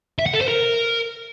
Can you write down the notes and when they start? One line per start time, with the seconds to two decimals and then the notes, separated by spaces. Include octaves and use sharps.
0.19 E5
0.26 F#5
0.34 A4
0.41 C5
0.48 A#4